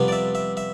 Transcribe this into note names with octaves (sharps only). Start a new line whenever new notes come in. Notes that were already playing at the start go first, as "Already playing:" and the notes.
Already playing: F2 C3 G3 B3
D5
E5
E5
E5